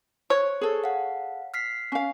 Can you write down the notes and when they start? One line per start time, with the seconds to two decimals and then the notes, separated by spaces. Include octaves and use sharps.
0.30 C5 C#5
0.61 G#4 A4
0.84 F5 F#5
1.54 F6 B6 C7
1.92 C#4 F5